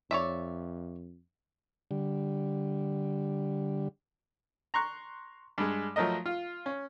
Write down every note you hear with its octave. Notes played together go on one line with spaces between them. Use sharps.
F2 C#5 D5 E5
D3 G3
A#5 C6 C#6 F#6
G2 G#3
F3 F#3 A3 A#4 D#5
F4
C#4